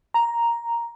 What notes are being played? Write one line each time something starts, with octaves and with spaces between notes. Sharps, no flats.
A#5